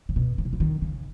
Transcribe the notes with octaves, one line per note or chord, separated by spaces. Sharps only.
C#3
B2
C#3
B2
C#3
D#3
C#3